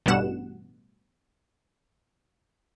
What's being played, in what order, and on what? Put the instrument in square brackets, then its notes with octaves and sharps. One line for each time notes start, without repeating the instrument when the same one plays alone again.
[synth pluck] A1 G2 B2 G3 F#5 E7